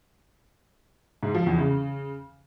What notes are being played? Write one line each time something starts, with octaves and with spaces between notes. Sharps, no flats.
G#2
F3
E2
C#3